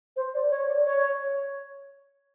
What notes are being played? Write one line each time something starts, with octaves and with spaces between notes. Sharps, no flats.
C5
D5
C#5
D5
C#5